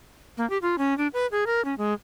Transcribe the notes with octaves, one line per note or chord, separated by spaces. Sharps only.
A#3
G4
F4
C#4
D4
B4
G#4
A#4
C#4
G#3